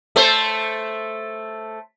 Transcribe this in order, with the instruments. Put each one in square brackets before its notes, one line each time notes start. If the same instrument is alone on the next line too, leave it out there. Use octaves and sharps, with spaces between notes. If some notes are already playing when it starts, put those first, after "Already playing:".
[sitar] A3 A4 C5